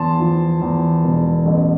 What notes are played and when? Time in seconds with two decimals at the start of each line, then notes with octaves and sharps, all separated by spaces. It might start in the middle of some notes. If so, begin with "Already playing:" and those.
Already playing: E2 A5 C6
0.19 F3
0.62 E2
1.04 E1
1.46 A1